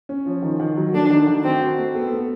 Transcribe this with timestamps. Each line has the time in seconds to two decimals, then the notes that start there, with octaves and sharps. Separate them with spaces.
0.09 C#4
0.26 F3
0.42 D#3
0.60 D#3
0.77 F#3
0.93 A3 D4
1.11 D#3
1.27 D#3
1.43 C4 F#4
1.60 F#4
1.78 A3
1.95 B3 A4
2.11 A3